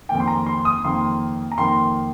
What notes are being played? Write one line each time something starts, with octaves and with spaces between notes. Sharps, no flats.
F2 D#3 A#3 G5
C6
A#5
C6
D#6
F2 D#3 A#3 C6
A#5
F2 D#3 A#3 C6